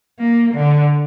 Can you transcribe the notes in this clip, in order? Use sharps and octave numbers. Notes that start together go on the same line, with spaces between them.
A#3
D3